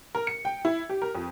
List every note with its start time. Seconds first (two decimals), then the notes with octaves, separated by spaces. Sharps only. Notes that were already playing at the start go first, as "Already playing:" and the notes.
0.15 A#4
0.27 C#7
0.45 G5
0.65 E4
0.90 G4
1.02 A#4
1.15 F2